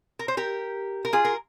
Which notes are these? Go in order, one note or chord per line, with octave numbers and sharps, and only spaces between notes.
A#4
C5
G4 A#4
A#4
F4 G#4
A#4